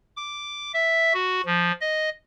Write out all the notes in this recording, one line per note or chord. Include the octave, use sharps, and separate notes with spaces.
D6
E5
F#4
F3
D#5